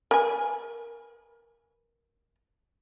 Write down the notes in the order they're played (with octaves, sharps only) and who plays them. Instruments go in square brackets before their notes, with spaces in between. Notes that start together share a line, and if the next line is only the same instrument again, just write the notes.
[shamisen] A#4 B4 G#5